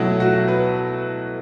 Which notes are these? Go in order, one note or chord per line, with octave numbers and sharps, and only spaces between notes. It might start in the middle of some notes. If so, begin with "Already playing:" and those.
Already playing: B2 F#3 A3 E4
F#4
B4